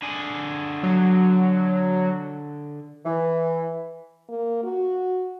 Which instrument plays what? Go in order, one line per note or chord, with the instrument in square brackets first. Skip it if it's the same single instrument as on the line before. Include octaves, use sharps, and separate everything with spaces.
[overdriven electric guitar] D3 G#4
[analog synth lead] F#3
[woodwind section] E3
[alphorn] A#3
F#4